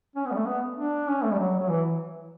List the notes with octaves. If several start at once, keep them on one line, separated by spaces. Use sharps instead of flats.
C#4
B3
G3
A3
B3
D4
C#4
A3
G3
F#3
F#3
E3